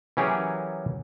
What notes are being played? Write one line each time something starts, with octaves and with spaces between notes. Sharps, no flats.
E3 F#3 C#4 G4 G#4 A#4